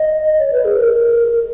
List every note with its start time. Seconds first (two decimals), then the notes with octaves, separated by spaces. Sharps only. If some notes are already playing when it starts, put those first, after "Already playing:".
Already playing: D#5
0.39 C#5
0.53 B4
0.65 G#4
0.78 A#4